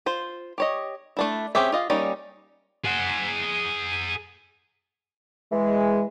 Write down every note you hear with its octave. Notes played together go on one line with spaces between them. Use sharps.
F4 C5
G4 C#5 D#5
A3 D4 E4
C4 C#4 G4 G#4 E5
F4 D#5 F5
G3 A#3 C#4 D#4 D5
G#4 F#5
E3 G#3